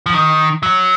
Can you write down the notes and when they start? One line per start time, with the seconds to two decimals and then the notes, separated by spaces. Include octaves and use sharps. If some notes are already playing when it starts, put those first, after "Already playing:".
0.06 F3
0.13 D#3
0.63 F#3